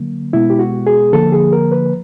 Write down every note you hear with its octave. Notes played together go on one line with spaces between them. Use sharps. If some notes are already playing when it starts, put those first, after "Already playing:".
Already playing: D3 F#3 A#3
B2 G#3 B3 E4
G4
F#4
G#4
D3 F3 A#3 A4
G#4
A#4
B4